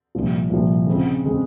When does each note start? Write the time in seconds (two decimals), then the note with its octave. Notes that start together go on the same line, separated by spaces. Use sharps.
0.15 C2 A#2 F3
0.50 C2 A#2 F3
0.87 C#3 G#3 C4
1.24 C#3 G#3 C4